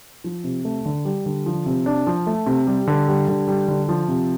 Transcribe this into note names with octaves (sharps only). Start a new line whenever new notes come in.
F3
C3
A3
D3
G3
D3
F3
C3
D4
F3
A3
C3
G3
D3
G3
D3
G3
D3
F3
C3